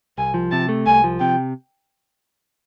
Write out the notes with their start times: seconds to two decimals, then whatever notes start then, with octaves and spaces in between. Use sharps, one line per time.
0.18 C2 G#5
0.34 F3
0.51 C3 A5
0.69 A3
0.86 C2 G#5
1.04 F3
1.20 C3 G5